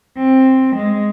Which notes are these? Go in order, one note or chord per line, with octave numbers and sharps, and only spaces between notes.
C4
G#3